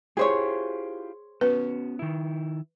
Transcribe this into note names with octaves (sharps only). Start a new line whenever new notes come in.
E4 F4 G4 G#4 C5 C#5
B3 C#4 F#4 B4
D#3 E4